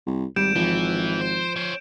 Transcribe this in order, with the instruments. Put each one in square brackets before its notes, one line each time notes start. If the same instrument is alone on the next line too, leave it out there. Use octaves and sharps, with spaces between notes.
[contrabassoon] C2
[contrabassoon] G#1 [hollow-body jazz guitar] G3 [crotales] G6 D7 E7
[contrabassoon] G#1 [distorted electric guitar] E3 [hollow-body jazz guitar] F3
[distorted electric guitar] C5
C#4 C5